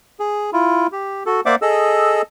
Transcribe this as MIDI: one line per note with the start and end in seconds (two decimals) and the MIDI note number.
0.20 0.50 68
0.53 0.87 64
0.53 0.87 65
0.92 1.23 67
1.26 1.41 66
1.26 1.41 69
1.46 1.55 58
1.46 1.55 72
1.46 1.55 74
1.46 1.55 76
1.46 1.55 78
1.46 1.55 86
1.62 2.22 68
1.62 2.22 69
1.62 2.22 75
1.62 2.22 88